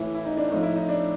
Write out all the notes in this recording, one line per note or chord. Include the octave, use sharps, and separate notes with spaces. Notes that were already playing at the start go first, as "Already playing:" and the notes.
Already playing: A2 E3 E4
E4
D#4
D4
A2 F3 D#4
E4
D#4
D4